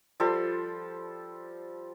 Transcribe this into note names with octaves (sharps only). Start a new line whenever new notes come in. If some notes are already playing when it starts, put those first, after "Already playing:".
F3 G3 A4 C6